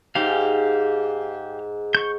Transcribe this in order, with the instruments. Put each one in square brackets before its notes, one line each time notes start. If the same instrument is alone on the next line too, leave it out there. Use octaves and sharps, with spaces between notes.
[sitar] G#2 [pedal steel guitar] G4 F5
[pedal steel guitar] C#6 G6